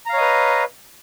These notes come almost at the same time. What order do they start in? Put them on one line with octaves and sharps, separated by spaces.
A#5 F5 C#5 D#5 B4